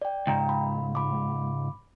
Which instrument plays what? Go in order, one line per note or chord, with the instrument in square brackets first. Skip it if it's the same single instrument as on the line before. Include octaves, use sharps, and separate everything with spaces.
[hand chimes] D5 G5
[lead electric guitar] C#2 G#2 [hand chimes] G5 A#5
[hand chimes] B5
B5 D6